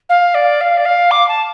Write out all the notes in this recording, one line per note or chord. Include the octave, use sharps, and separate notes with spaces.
F5
D5
F5
D5
F5
D6
A5